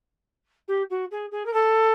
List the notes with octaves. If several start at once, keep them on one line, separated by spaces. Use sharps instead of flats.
G4
F#4
G#4
G#4
A#4
A4